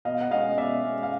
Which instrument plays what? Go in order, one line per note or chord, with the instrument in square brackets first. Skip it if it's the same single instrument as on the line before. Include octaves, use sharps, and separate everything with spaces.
[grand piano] B2 D#5 F5
F#5
G#3 C#4 D#5 F5
B2 D5 E5
G#3 C#4
F5